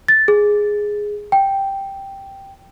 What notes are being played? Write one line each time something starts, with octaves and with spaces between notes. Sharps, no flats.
A6
G#4
G5